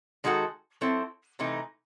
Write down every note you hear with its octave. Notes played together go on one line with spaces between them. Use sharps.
D#3 G#3 D#4 F#4 A4
F#3 C4 E4 A4
C3 E3 A3 D#4